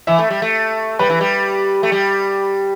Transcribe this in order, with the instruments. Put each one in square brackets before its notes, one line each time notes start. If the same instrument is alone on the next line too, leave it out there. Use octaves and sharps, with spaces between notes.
[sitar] E3 [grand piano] E5
[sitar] A3
G3
A3
[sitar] G3 [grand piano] B4
[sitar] E3
G3
A3
G3